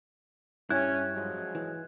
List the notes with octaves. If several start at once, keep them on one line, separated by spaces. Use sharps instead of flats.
G2 C#4 E4 F#6 G#6
F3 F#3 G#3
E3